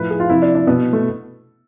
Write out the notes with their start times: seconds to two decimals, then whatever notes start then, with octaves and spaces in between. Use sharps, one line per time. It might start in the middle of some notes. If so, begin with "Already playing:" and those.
Already playing: A2 F3 B4
0.10 G#4
0.20 F4
0.29 C3 F3 E4
0.42 D4
0.55 D4
0.67 B2 B3
0.93 A3